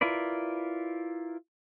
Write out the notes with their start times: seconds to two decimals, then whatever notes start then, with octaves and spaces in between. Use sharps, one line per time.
0.01 E4 F4 A#4 B4 D5